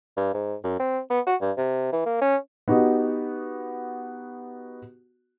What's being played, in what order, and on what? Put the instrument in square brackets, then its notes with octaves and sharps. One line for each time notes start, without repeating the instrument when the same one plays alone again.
[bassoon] G2
G#2
F#2
C4
B3
F#4
G2
C3
E3
A#3
C#4
[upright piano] B3 D#4 F#4 G4